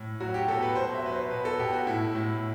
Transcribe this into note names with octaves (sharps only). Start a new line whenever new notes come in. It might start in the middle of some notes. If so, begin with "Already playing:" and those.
Already playing: A2
F#3 F#4
G4
B2 A4
B4
B2 C5
E5
F#3 B4
C5
B2 B4
A4
B2 G4
F#4
A2 E4
A2